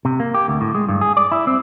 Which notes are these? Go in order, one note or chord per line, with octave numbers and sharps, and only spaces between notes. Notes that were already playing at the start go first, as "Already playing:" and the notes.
C3
A#3
G4
D2
A2
G#3
G2
G#4
D5
E4
C4